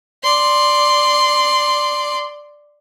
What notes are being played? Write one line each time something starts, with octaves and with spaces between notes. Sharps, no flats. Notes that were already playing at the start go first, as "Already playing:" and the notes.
D5 C6